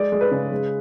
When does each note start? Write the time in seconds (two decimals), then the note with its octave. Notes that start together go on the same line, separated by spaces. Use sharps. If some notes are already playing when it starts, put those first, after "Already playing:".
Already playing: G#3 D5
0.12 G#3
0.21 B4
0.31 C#3
0.51 G#3